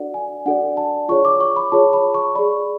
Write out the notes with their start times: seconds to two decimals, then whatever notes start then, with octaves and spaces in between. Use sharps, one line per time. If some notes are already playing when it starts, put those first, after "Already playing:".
Already playing: D4 F#4 A4 D5 F#5
0.14 G#5
0.46 D4 F#4 A4 D5 F#5
0.77 A5
1.09 F4 G#4 C#5 C#6
1.25 D6
1.41 C#6
1.56 B5
1.72 F4 G#4 C#5 A5
1.93 B5
2.14 C#6
2.35 G#4 D5 B5